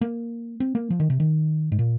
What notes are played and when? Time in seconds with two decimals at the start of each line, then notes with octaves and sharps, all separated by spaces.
0.01 A#3
0.60 C4
0.75 A#3
0.90 F3
1.00 D#3
1.10 C3
1.20 D#3
1.72 G#2
1.79 A#2